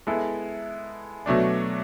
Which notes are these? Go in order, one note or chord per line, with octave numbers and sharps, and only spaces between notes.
G#3 B3 E4 A4
B2 F#3 A3 D4